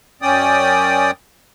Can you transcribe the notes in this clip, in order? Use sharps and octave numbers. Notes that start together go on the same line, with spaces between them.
F#2 C#4 D5 G5 D#6